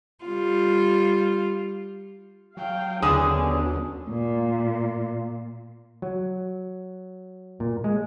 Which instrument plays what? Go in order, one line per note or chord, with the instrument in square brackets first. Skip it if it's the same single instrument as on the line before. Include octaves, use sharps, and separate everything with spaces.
[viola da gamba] G3 F4
[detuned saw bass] F#3 [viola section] F5 G5
[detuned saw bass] D#2 [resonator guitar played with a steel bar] D3 D4 G#4 [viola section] F#3 B3 C#4 [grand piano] D#6
[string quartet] A#2
[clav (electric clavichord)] F#3
A#2
G#3